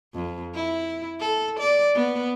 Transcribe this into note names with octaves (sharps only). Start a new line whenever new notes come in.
F2
E4
A4
D5
B3